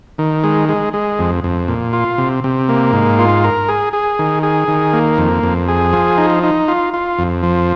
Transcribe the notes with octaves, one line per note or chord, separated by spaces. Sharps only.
D#3
G#3
G#3
G#3
F2
F2
A#2
F4
C3
C3
A#3
G#2
F4
A#4
G#4
G#4
D#3
G#4
D#3
A#3
F2
F2
G#4
F3
D#4
D#4
F4
F4
F2
F3